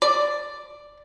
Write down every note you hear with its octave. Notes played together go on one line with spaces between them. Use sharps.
D5